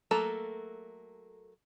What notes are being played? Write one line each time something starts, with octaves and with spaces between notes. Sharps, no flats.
F#3 A3 A#3 A4 A#5